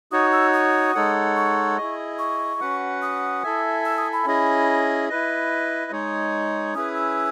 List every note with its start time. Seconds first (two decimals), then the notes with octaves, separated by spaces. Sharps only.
0.11 D#4 F#4 C#5 D#6
0.32 E6
0.53 D#6
0.95 G#3 D#4 A4 C#5 F#5
1.36 C#6
1.77 E4 G#4 D#5
2.19 C#6
2.61 C#4 F#4 B4 F#5
3.02 D#6
3.43 E4 A4 E5 G#5
3.85 E6
3.98 D#6
4.13 B5
4.26 C#4 E4 G#4 D#5
5.09 E4 B4 D#5
5.91 G#3 D#4 G#4 C#5
6.74 C#4 E4 G#4 B4 D#6
6.95 E6